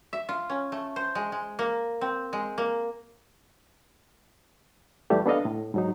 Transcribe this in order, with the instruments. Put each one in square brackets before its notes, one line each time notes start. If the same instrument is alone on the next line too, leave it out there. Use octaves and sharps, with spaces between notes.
[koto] E5
F4
C#4
A3
C5
G#3
G#3
A#3
C4
G#3
A#3
[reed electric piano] F2 E3 G3 A3 G4
B3 D4 A4 D#5 F5
A2
G#2 F#3 D#4